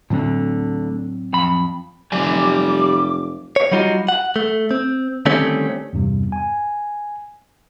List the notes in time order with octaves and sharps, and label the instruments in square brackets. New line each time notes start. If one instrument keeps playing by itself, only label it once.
[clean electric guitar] D2 D3 [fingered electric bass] A2 F#3 C4
[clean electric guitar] F2 B5
[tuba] F1 [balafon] F#3 [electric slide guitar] G4 D5 G#5 [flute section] D6
[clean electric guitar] C#5
F#3 G3 D#4 F4 F#4
F#5
A3
C4
D3 D#3 G3 A3 C4 C#4
[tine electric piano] E2 G2 C3 G3
G#5